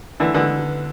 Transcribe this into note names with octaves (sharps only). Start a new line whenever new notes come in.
D3 E3
D3 E3